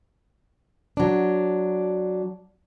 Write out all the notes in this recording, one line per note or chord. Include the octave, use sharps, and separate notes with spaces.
F#3 D4